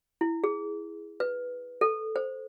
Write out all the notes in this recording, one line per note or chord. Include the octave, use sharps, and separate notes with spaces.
E4
G#4
B4
A4
C5